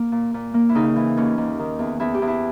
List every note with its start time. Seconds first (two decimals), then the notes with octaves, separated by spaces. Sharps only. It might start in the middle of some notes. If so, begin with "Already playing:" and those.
Already playing: A#3
0.12 A#2
0.34 A#2
0.54 A#3
0.69 E4
0.75 C#3 D#4
0.96 E3
1.17 D#2 C#4
1.38 D#2
1.59 D#3
1.79 E2
2.00 E2 E4
2.15 G4
2.22 E2
2.28 E4